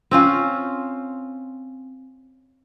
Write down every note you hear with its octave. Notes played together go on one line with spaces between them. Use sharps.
C4 C#4 F4